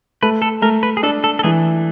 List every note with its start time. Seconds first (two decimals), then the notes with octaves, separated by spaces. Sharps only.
0.22 A3 B4
0.42 A4
0.62 A3 A#4
0.83 B4
0.97 G#4
1.03 D4 A4
1.24 A4
1.39 A4
1.43 E3 G#4